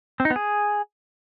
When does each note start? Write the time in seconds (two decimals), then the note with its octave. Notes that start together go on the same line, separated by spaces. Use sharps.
0.20 C4
0.25 D#4
0.30 B3
0.36 G#4